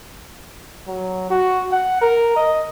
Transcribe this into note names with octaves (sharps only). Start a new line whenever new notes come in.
F#3
F#4
F#5
A#4
D#5